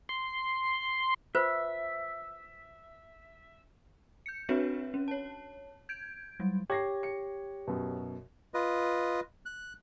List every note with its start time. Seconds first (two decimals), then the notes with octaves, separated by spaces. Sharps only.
0.09 C6
1.35 F4 B4 C5 E5
4.26 G6 C#7
4.49 C4 D4 F#4 B4 C#5 E5
4.94 C#4
5.08 C#5 A5
5.89 G6 G#6 D7
6.40 F#3 G3
6.70 G4 C#5 G#6 A#6 C7
7.03 C#7
7.67 F#2 B2
8.54 F4 B4 D#5
9.46 F#6